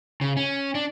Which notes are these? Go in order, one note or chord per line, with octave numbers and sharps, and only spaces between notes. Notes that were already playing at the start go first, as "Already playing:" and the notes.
C#3
C#4
D4